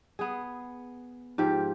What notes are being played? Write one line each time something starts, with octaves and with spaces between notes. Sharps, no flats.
B3 G#4
G#2 F3 G4